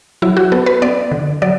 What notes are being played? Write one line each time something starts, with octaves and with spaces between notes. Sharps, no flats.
F#3 E4
F#4
B3 A4
B4
B3 D5
D3
F#3 D5